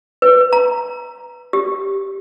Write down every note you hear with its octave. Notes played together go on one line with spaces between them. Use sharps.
B4
A#5
G4